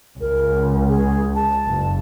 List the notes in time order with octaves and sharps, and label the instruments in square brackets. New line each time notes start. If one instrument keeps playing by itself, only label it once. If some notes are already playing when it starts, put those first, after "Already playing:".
[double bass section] C#2 [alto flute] A#4
[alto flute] G#4
A5
[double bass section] F#1